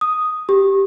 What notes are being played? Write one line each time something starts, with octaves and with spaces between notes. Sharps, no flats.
D#6
G4